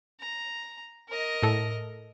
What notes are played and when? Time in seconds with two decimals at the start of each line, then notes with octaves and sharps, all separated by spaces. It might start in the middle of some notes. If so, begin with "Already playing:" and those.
0.20 A#5
1.09 A#4 D#5
1.43 A2 A4